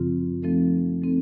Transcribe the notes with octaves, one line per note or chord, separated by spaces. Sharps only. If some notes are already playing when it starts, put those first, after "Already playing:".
Already playing: F#2 C#3 F3 C4 F4
F3 A3 C4 D#4 A4
F3 A3 C4 D#4 A4